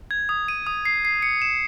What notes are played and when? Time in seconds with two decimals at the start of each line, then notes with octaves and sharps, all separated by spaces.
0.11 G#6
0.29 D#6
0.48 D#7
0.67 D#6
0.85 C7
1.05 C7
1.22 C#7
1.42 E7